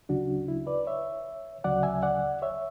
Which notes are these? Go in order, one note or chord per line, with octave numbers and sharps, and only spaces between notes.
D2 C#3 F#3 D4 F#4
E4
B4 D5
C#5 E5
D2 C#3 F#3 D5 F#5
E5 G#5
D5 F#5
C#5 E5